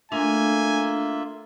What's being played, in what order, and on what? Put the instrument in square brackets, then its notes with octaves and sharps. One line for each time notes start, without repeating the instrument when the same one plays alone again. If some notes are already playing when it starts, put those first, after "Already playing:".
[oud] A3 [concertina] A#3 F4 E5 [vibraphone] D4 [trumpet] G#5